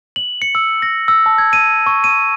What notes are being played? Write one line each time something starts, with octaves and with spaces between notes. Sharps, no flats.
F#7
C#7
E6
A#6
E6
A5
G#6
D#7
C#6
D#7